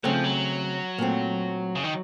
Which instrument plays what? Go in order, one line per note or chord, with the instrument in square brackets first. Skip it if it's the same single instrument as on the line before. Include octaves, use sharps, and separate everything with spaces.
[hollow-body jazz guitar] C#3 A3 C4 [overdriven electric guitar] F#3
[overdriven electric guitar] F3
F#3
[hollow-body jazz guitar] A#2 A3 C4
[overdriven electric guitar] C#3
D#3